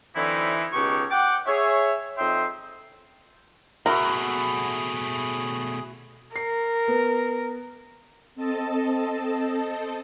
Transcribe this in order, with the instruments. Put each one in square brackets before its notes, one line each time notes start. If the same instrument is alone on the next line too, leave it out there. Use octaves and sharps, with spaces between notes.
[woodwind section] D3 E3 F#3 C4 D#4 E4
C#2 B2 D#4 G4 C#5 C#6
F#5 G5 D6
G#4 C#5 E5
F2 D#4 E5 G5 C6
[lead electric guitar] B2 A3 [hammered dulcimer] E4 F#4 [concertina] G#4 [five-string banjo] A#4
[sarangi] A#4 [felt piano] C7
[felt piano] B3
[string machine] C4 A4 D#5 A5